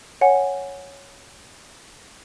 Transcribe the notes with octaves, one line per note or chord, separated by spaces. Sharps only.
C#5 F#5 G#5